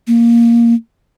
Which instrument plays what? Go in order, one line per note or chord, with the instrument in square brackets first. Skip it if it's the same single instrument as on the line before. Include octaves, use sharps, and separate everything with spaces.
[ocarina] A#3